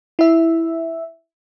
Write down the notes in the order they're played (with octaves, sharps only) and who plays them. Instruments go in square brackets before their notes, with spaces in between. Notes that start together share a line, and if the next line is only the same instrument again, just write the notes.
[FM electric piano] E4 E5